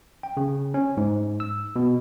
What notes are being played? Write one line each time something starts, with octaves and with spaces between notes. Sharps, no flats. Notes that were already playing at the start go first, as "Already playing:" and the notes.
G5
C#3
C#4
G#2
E6
B2